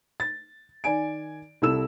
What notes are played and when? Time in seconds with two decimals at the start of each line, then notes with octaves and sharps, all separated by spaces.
0.20 A6
0.84 D#3 D5 G#5 D7
1.62 C2 E4 A4 E6 E7